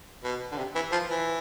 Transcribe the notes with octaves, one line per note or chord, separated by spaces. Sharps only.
B2
D3
C3
E3
F3
E3